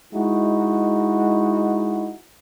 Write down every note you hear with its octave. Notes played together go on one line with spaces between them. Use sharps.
G#3 D#4 E4 F#4